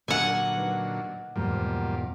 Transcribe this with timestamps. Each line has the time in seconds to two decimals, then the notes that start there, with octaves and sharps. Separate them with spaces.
0.08 A#2 D3 F#3 F#5 G#5
0.57 D#4 B4
1.36 E2 G#2 B2 F3 G3 A#3